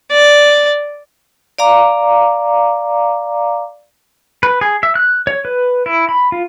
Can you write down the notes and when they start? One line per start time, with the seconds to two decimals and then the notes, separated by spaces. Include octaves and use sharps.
0.12 D5
1.59 D5 F5 A#5 D6
4.43 B4
4.61 G#4
4.83 E5
4.95 F#6
5.27 C#5
5.45 B4
5.86 E4
6.09 B5
6.32 F4